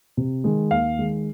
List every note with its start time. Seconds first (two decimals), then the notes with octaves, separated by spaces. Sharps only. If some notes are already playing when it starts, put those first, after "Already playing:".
0.17 C3
0.44 D#3 G#3
0.71 D#2 F5
0.99 D#3 G#3